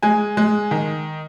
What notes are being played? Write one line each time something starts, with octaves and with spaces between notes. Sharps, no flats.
G#3 G#5
G#3
D#3